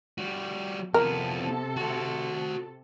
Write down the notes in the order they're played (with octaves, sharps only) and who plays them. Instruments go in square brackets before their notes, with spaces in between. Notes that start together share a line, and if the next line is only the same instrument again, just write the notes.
[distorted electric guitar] G3 F#4
[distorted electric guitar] F2 B3 [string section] C3 A4 [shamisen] A#4
[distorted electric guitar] F#4 C5